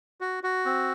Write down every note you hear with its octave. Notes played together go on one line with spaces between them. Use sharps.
F#4
F#4
C4